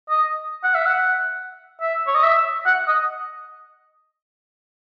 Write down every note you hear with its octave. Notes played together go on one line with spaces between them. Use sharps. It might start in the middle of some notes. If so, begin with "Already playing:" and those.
D#5
F#5
E5
F#5
E5
C#5
D#5
E5
F#5
D#5